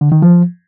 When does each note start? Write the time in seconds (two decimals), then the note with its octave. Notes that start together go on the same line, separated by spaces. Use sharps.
0.01 D3
0.12 D#3
0.22 F3